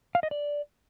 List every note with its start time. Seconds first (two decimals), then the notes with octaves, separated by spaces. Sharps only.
0.15 F5
0.23 D#5
0.31 D5